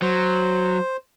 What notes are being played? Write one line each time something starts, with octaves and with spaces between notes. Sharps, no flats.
F#3 C5